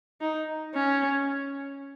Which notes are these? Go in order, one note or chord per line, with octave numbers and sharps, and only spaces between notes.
D#4
C#4